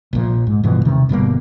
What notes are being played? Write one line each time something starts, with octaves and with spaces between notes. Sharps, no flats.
A#1 A#2 F3
G#2
G2 B2 E3 F3
E1 C3 D#3
G1 B2 G3 A#3